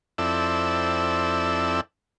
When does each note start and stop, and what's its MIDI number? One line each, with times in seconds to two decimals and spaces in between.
0.18 1.81 41
0.18 1.81 60
0.18 1.81 64
0.18 1.81 69
0.18 1.81 74
0.18 1.81 88